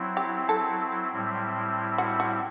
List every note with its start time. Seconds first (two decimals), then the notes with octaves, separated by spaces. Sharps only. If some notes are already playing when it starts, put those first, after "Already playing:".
Already playing: F#3 C4 E4
0.17 G4
0.49 A4
1.13 A2 G3 C4 E4
1.98 F#4
2.20 F#4